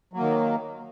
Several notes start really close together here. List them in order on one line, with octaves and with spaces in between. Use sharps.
F#3 A#3 D#3